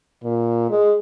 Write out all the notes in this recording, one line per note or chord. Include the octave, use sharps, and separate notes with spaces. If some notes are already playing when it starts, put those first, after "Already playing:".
A#2
G#3